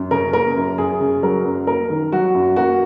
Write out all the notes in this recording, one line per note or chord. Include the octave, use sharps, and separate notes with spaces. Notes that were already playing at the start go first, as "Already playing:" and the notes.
Already playing: F#2
C#3 A#4
A#3 A#4
F#2
F#2 G#4
C#3
F#3 A#4
F#2
A#3 A#4
D#3
F#3 F#4
F#2
A#3 F#4